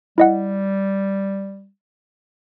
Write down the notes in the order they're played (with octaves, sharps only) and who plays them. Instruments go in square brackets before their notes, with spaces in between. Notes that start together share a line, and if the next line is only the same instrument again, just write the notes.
[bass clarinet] G3 [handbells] E4 D#5 F#5